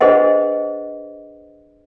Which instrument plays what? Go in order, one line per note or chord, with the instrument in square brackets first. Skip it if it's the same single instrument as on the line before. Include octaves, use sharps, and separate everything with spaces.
[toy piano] D4 G#4 B4 C5 D#5 F#5